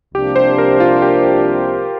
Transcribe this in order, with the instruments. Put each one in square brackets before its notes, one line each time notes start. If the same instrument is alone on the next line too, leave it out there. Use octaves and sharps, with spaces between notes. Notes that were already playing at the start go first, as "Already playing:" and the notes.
[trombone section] C2 C3 F3 A#3 D4 [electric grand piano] G4
[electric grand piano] C5
A#4
F4
G4